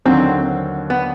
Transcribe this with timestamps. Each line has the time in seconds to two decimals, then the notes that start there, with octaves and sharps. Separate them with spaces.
0.05 D#2 D3 F#3 C4
0.90 B3